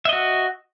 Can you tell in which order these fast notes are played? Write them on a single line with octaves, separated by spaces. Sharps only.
E5 D#5 F#4